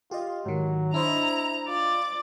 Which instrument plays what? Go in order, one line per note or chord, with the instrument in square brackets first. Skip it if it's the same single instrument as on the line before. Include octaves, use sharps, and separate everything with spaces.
[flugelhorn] F4 [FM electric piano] G4 D#5
[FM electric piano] G#2 D#3 [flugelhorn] F#3
[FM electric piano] D4 C5 D#5 [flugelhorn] E4 [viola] A#5
[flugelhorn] F4 [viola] D5